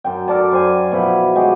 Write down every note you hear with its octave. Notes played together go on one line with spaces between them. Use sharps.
F#2 G5
A4 A#4 D5 A5
F#2 C5 G5 G#5
B2 F3 E4 B5
G#3 F#4 G4 D#5